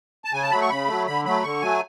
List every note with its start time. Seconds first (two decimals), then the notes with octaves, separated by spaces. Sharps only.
0.25 A5
0.33 C#3 G#5
0.43 A5
0.51 F#3 A3 B5
0.61 C#6
0.70 C#3 B5
0.88 F#3 A3
1.07 D3 B5
1.25 F#3 A3 B5
1.44 D3 C#6
1.62 F#3 A3 G#5